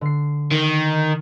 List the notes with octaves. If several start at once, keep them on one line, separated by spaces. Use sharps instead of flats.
D3 C7
D#3